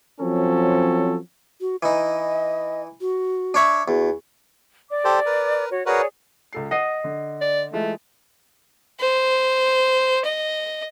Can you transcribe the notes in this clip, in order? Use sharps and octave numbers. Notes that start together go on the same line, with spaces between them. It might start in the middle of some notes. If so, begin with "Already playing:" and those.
F3 F#3 C4 C#4 A4
F#4
E3 D#4 D#5
F#4
D4 C#5 E5
E2 F#4
D5 D6
G4 A4 C5
A#4 B4
F#4 C#5
F#4 G#4 A#4 B4 C#5 D5
C#2 A4 C7
D#5 F#5 C7
D3
D5
E3 G#3 A3 F4
C5
D#5